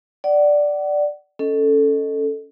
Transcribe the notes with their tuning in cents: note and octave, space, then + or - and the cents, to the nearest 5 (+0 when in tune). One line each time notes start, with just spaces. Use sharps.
D5 +0 F#5 +30
C#4 +5 A4 +0 D#5 +0